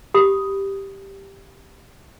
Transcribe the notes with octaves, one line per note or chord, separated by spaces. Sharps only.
G4 B5 D#6